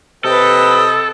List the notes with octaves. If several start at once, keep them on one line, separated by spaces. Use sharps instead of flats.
C3 A4 B4 D#5 G5